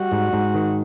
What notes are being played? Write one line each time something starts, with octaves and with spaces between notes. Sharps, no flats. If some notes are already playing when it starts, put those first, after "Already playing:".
Already playing: G3 F#4
G#2
G#2
D#3